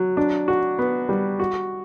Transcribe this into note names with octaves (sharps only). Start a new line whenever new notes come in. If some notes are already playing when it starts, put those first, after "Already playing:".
Already playing: F#3
D4
F#4
B3
G3
F#4